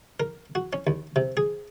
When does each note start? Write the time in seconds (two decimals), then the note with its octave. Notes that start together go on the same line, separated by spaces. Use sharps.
0.20 A#4
0.55 F#4
0.73 C#4
0.87 D#2
1.16 C3
1.37 G#4